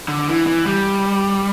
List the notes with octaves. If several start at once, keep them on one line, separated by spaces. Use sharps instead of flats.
D3
E3
E3
G3